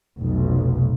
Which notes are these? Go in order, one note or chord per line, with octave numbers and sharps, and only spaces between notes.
F1 B1